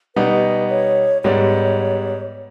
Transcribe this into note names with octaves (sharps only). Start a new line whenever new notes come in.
B2 G3 B3 D#4 B4
C#5
G#2 G3 B3 C#5